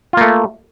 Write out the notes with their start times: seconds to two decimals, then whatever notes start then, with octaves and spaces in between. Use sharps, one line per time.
0.13 F4
0.17 A#3
0.21 A3